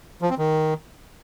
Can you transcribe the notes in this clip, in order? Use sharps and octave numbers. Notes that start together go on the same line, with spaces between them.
F3
C4
D#3